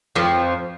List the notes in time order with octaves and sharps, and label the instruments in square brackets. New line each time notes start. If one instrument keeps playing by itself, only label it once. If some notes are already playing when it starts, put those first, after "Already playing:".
[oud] F2 F3